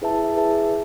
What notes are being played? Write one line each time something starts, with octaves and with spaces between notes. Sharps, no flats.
E4 G#4 B4 E5 A5
E4 G#4 B4 E5 A5